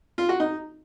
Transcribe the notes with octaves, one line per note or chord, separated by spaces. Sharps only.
F4
F#4
D#4